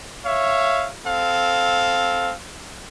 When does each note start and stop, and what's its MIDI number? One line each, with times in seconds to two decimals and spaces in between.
0.24 0.87 73
0.24 0.87 76
0.24 0.87 77
1.05 2.33 60
1.05 2.33 69
1.05 2.33 77